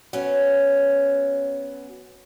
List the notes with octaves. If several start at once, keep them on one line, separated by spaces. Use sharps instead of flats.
F#3 B3 C#4